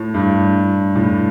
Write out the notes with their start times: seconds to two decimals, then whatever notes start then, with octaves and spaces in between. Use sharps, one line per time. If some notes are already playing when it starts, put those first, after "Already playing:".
Already playing: A2
0.14 G2
0.96 A2